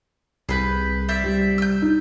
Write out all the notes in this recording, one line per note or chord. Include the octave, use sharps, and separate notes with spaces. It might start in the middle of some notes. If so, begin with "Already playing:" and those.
C2 G#4 B4 G6
C5 D5 E5
G3
E6 G6
D#4